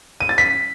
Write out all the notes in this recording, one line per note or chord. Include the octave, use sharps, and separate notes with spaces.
D#7
A6
B6